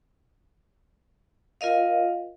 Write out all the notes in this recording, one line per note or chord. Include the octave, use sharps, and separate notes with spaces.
F4 A#4 D#5 F5